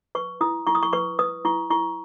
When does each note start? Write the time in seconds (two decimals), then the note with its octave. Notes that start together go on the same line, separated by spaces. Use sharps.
0.15 B4 C#6
0.41 E4 D#6
0.67 E4 C#6
0.75 D#6
0.83 C#6
0.93 B4 C#6
1.19 B4 D#6
1.45 E4 C#6
1.70 E4 C#6